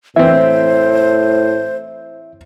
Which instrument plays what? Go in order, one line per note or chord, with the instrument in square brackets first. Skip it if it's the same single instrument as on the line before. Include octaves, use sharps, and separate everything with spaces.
[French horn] A2 [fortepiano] E3 C4 [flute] C5 [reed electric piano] E5